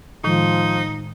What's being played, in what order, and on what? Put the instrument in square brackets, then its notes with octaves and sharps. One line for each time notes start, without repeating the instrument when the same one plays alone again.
[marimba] A2 D#3 G#3 [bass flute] F3 [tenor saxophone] D#4